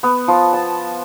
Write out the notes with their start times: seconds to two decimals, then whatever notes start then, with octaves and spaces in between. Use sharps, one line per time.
0.03 B3
0.28 F3
0.53 A5